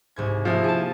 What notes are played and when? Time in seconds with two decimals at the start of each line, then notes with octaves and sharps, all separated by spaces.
0.16 C2 G#2 G#6
0.45 F3 A#3 D#4 E4 G#4
0.64 G#4 A5